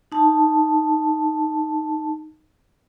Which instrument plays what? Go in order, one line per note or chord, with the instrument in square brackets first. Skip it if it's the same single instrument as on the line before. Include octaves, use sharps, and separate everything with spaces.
[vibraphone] D#4 A5